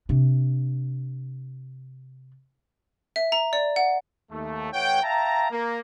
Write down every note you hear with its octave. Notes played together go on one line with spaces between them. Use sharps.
C3 D4
E5
A#5
D5
F#5
D#2 A3
A2 E3 C#5 F#5 G5
E5 F5 G5 A5 A#5
A#3